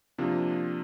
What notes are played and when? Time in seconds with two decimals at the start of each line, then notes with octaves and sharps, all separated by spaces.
0.18 C3 F3 A#3 D4 F4